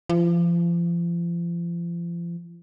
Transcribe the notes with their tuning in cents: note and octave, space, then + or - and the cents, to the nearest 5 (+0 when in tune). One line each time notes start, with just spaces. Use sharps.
F3 -35